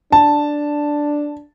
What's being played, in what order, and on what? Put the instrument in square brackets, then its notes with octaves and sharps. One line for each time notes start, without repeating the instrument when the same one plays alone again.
[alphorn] D4 [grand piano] A5